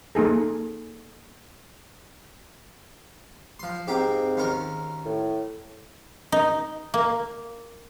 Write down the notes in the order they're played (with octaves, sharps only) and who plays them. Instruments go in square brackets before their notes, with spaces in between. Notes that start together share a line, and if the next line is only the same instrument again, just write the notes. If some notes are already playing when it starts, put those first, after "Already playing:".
[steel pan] A#3 D#4 G#4 A4
[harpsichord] F3 C6
[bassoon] G#2 [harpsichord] A#3 C4 G4
[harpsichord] D#2 C#4 A#4
[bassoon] A2
[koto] D#4
A#3